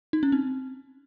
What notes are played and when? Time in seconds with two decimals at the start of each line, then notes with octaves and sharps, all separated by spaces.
0.13 D#4
0.23 C#4
0.32 C4